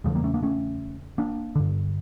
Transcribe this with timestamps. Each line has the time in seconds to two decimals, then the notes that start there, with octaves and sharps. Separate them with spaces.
0.04 E2 C#3 F3 A3
0.15 G3 A#3
0.24 A3 C#4
0.34 A#3 D4
0.43 A3 C#4
1.18 A#3 D4
1.55 G2 D3